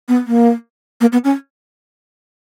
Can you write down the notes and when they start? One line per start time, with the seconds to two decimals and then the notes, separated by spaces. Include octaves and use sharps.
0.09 B3
0.27 A#3
1.01 A#3
1.12 B3
1.24 C#4